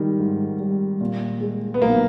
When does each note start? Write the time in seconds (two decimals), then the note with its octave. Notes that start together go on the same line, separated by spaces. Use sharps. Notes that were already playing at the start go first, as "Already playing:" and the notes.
Already playing: G#2 D#3 G3
0.20 G#2
0.60 G3
1.01 A#2
1.41 G#3
1.74 B3
1.82 B1 A#3